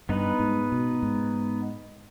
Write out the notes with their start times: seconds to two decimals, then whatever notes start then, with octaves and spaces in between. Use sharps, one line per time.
0.09 G2 B3 D#4 B4
0.40 G#2
0.72 B2
1.03 G#2